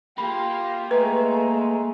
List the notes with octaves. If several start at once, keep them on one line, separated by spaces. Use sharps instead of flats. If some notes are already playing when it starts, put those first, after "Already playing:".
A#3 F4 G4 B5
G#3 A3 B4 A#5